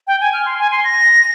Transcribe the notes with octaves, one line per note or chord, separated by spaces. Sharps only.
G5
G#5
F6
C6
G#5
C6
A#6